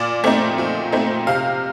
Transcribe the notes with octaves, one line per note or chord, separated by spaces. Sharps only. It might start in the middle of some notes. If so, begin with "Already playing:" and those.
Already playing: A#2 D5
A3 C4 D#4
A#2
A3 C4 D#4
C3 F5